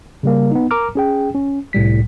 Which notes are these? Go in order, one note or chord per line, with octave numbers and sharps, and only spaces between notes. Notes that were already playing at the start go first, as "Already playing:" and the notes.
C#3 G3 A#3
B3 D#4
A#4 A#5 D6 F6
C#4 G#4 G5
C#4
C2 A2 G3 B6